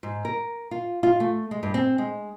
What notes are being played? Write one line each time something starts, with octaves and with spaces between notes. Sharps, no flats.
G#2
A#4
F4
F4
A3
G#3
G2
C4
G#3